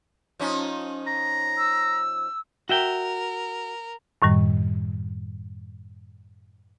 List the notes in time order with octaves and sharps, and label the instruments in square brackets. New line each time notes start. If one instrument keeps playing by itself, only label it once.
[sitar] F3 C#4 D#4
[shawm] A#5
[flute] E6
[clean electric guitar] F#4 E5 G5 [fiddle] A#4
[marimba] F#2 A2 D#3 G3